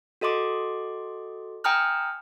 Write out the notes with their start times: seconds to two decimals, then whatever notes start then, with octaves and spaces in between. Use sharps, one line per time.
0.21 F#4 A4 D#5 C6 D6
1.64 G5 G#5 A#5 D#6 F6 F#6